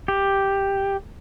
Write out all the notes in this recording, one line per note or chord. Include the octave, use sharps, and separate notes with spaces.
G4